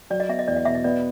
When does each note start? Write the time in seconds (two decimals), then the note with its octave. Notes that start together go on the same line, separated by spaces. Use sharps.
0.10 F#3 D5
0.20 D#5
0.29 B3 E5
0.39 D#5
0.48 E2 D5
0.56 D#5
0.65 B2 E5
0.75 D#5
0.84 B3 D5